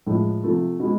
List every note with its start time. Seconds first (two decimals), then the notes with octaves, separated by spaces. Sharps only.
0.06 A2 F3 G#3
0.43 C3 F3 A3
0.80 B2 G#3